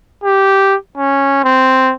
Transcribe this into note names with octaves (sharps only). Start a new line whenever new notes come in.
G4
C#4
C4